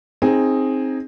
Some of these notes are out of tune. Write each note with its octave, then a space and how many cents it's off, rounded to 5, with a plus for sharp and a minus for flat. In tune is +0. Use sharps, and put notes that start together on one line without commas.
C4 +15 D#4 +0 G#4 +0